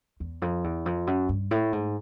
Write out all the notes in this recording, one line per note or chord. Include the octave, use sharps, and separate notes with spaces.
E2
F2
E2
F2
F#2
G2
A2
G#2